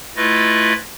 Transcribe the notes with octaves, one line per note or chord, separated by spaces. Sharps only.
A3 E4 F4 B4 D#5